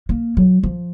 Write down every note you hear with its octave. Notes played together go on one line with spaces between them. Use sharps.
A#3
F#3
F3